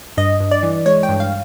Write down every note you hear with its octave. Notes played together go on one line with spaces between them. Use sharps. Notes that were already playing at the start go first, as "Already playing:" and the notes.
G2 D#5
G2
D5
E3
G#3 C#5
G5
G2
F5